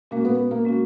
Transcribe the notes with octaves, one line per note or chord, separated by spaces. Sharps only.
A#2 G#3 A#3 C#4 F#4
B3
A#3
G#3 C#4 F#4